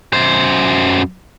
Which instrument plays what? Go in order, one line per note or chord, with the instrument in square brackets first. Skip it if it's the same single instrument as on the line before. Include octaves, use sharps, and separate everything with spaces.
[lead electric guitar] F#2 C5